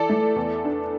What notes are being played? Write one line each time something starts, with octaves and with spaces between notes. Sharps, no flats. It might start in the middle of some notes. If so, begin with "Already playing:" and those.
Already playing: E3 A4 D5
A3
E2
D4